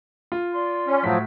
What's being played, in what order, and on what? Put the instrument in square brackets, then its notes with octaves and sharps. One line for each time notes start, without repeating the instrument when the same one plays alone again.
[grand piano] F4
[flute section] D5 C6
[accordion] C#4
[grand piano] A2 F#4 B6 [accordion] F3 F#3